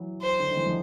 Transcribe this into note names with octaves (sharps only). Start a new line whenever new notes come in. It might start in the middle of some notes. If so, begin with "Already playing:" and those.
Already playing: E3 F#3
C5
D3
D#3
E3
D#3 F3